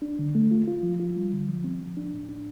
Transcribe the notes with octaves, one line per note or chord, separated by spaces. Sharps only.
D4
D3
A3
F4
F4
F3
F4
G3
D3
F3
C4
F3
D4
A2
D4